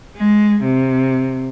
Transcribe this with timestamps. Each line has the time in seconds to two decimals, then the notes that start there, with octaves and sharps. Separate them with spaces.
0.17 G#3
0.64 C3